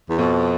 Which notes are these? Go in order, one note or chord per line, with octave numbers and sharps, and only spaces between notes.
E2
F2 B2